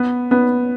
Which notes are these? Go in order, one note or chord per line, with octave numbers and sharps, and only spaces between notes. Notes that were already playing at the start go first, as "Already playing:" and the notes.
Already playing: B3 B4
B3 B4